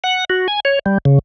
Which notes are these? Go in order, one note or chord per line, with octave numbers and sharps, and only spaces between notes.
F#5
F#4
G#5
C#5
G3
C#3